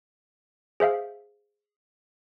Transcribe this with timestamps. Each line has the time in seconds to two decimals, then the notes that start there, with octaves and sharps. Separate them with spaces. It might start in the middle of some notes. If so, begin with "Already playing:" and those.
0.80 G#4 C5 E5 F5